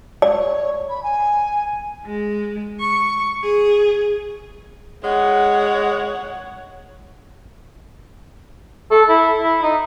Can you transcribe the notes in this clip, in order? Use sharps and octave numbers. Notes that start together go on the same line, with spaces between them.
C#5 D5
B5
G#5
G#3
C#6
G#4
G#3 C#5 F#5
A4
E4
E4
D#4